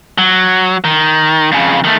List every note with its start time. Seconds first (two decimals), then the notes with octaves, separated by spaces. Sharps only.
0.18 F#3
0.84 D#3
1.52 F2 C#3
1.84 D#3 A3